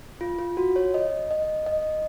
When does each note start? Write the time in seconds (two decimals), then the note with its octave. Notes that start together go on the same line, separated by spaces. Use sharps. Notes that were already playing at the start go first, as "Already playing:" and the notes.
0.21 F4
0.39 F4
0.57 F#4
0.76 C#5
0.94 D#5
1.31 D#5
1.66 D#5